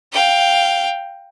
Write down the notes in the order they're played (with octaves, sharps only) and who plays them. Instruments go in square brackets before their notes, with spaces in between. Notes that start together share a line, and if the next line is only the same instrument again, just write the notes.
[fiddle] F5 G5